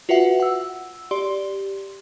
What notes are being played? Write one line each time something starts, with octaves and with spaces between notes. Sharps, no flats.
F4 F#4 B4 E5 F#5
F#5 E6
G4 D5 C6